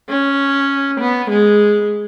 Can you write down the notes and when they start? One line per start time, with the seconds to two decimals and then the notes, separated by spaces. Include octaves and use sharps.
0.09 C#4
1.00 B3
1.30 G#3